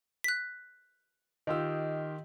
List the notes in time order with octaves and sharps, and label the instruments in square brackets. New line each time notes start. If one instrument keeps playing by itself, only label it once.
[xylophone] F#6 B6
[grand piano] D#3 G4 E6 [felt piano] F4 D#5